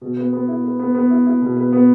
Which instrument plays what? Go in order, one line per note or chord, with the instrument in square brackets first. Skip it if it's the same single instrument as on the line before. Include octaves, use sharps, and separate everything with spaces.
[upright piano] B2
B3
B3
E4
B4
B3
B3
E4
E4
B2
B4
B3